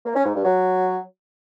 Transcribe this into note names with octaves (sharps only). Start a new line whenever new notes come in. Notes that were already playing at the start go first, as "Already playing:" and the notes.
A#3
C#4
G#2
G2
F#3